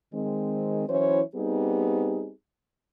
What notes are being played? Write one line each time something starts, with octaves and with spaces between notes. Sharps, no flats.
D#3 G#3 C4
E3 F#3 C#4 E4 C5 C#5
G3 B3 C4 D#4 G4 G#4